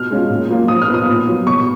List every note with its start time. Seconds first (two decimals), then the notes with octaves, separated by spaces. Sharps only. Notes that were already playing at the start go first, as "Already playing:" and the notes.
Already playing: B2 F6
0.11 G#3 C#4 F4
0.30 A#2
0.49 F#3 A#3 F4
0.68 F3 D#6
0.82 F6
0.88 B3 F4
0.94 D#6
1.08 A#2
1.27 F#3 B3 F4
1.47 B2 C#6